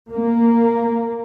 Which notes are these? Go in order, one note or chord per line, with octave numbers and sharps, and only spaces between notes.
A#3